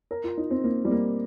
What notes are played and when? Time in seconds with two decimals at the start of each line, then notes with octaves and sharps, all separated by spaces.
0.11 A#4
0.24 F4
0.37 D#4
0.51 C4
0.64 A#3
0.85 G3
0.91 A#3